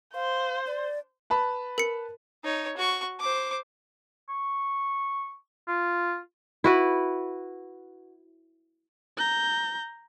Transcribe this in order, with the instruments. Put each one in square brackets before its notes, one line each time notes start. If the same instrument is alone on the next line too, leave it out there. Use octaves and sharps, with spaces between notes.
[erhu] C5 [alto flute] F5
[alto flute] D5
[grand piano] B4 A5 B5
[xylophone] A#4 C#7
[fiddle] D#4 C#5
F#4 C#6
C5 D6
[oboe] C#6
F4
[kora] E4 F#4 B4
[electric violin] A#5 G6